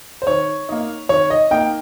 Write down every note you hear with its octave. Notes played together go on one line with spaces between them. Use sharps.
C5
D#3 C#5
A#3 D#4
D#3 C#5
D#5
A#3 D#4 G5